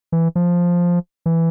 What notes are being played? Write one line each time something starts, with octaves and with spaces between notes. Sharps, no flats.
E3
F3
E3